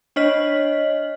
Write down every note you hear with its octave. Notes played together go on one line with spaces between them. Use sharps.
D4 C#5 D#5 F6 B6 F#7